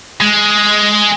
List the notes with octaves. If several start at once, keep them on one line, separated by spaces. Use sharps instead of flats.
G#3